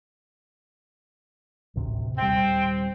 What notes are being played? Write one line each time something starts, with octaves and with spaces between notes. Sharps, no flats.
A1 D2 C3
D#1 G3 C4